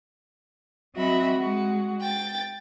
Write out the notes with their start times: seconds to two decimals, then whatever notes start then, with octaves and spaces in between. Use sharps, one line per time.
0.96 F#3 C4 F#4 D#5 E5 B5
1.34 G#3 F#4
2.01 G5 A6